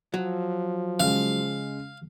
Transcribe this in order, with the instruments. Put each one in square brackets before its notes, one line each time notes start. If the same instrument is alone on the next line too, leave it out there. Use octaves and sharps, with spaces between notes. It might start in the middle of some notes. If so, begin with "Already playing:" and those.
[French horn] F3 [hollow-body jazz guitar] F#3
[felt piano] C#3 G#3 [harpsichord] F5